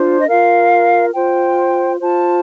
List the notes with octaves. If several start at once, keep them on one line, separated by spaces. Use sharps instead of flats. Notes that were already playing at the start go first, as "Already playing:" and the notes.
Already playing: D4 F4 C5
D#5
F4 A#4 F5
F4 C5 G5
F4 C5 A5